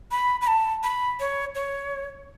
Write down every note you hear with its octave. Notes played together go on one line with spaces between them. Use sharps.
B5
B5
A5
B5
C#5
C#5